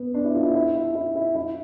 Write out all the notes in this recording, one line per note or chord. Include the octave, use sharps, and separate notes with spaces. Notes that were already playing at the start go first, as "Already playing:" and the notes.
Already playing: B3
D4
E4
F4
E4
E4
E4
E4
E4
E4